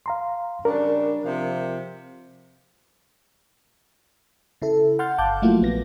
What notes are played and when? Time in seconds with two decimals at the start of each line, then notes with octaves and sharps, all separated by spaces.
0.06 F5 A#5 C6
0.65 C#3 G3 D4 A#4
1.24 C3 F3
4.62 C#3 E4 A4
4.99 F#5 C6 F6 G6 A6
5.18 G1 F5 A5 D6 F#6 G6
5.42 F3 F#3 A3 A#3 E4 F4
5.62 A#1 B3 A#6